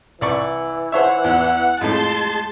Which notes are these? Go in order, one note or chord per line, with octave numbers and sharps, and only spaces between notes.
C2 E3 D5 C#6
C5 C#5 E5 F#5
E2
F2 A2 G#3 A5 C6